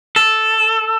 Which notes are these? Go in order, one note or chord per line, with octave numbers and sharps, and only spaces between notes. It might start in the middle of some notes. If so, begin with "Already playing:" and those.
A4